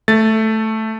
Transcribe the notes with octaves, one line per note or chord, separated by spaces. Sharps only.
A3 A6